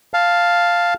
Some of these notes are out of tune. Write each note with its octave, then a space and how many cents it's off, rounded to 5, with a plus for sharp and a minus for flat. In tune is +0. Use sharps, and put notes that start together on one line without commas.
F5 +0 A5 +0